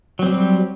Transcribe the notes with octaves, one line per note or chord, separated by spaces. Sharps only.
F#3 G3 C4